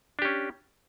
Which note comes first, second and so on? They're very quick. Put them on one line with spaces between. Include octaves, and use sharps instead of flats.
D4 G4 C#4